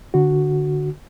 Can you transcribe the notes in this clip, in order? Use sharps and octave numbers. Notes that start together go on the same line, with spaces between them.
D3 F#4